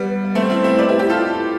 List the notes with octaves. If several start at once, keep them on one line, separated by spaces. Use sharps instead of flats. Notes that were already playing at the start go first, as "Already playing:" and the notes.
Already playing: G3 B3
B3
A3 C4
C4 E4
C4 E4
B4 D5
E4 G4
E4 G4
F4 A4